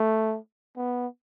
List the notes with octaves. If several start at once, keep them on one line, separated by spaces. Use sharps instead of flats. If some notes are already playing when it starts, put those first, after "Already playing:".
Already playing: A3
B3